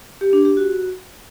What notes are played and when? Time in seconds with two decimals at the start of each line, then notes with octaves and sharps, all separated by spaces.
0.21 G4
0.33 D4
0.45 G4
0.57 F#4